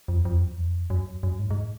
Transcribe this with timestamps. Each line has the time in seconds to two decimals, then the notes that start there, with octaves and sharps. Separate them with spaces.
0.08 F2
0.25 F2
0.42 F#2
0.49 E2
0.57 F2
0.90 F#2
1.23 F#2
1.39 G#2
1.51 G#2